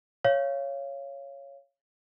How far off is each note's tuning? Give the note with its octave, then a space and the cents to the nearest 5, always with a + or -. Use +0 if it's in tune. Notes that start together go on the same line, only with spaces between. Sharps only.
C#5 +0 F5 -20